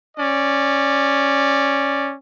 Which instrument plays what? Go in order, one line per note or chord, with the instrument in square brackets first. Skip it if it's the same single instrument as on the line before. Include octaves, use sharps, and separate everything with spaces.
[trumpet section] C#4 D5